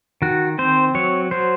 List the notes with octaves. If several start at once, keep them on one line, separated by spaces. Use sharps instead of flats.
D#3 F#4
C4 C5
F#3 C#5
F#3 C5